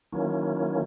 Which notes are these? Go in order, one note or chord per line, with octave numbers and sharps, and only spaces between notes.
D#3 E3 F#3 A#3 C#4